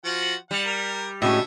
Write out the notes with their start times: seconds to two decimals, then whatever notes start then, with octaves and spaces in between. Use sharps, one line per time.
0.05 F3 F#4 F#5
0.51 G3 F#5
0.66 A#4
1.22 A2 D3 G#3 C#4 F#4 E5